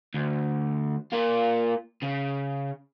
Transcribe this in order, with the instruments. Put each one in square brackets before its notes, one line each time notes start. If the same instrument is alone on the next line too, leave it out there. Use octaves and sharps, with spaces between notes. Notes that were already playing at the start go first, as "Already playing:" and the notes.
[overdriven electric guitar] D2
A#3 F4
C#3